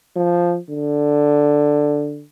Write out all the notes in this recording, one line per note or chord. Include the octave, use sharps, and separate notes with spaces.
F3
D3